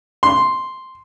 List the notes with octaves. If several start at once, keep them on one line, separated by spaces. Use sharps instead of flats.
C6